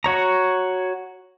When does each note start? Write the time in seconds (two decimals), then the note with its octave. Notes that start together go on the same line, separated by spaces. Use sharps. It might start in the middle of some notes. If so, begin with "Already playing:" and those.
0.04 F#4 C#5 A#5